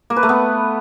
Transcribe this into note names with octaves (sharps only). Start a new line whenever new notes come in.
A#3
B4
A3
B3